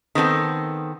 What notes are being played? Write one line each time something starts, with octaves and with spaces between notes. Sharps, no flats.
D#3 B3 C4 A4